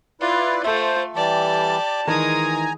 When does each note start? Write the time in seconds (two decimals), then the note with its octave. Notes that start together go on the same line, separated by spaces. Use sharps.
0.21 E4 F4 B4 D5
0.64 A3 F4 A4 C5 E5
1.15 E3 G3 G4 D5 A5
2.07 D#3 E3 G#3 G#5 A#5 D#6